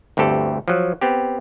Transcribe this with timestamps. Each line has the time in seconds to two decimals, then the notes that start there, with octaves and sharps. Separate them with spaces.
0.17 G1 D2 C4 G4 A4
0.68 F3 F#3
1.01 B3 C4 G4